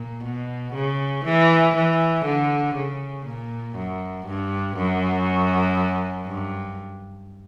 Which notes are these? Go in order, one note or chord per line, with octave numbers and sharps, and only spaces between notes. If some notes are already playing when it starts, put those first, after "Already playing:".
Already playing: A#2
B2
C#3
E3
E3
D3
C#3
A#2
F#2
G2
F#2
G2